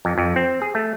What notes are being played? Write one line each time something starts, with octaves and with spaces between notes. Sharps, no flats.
F2
F2
C4
G#4
A3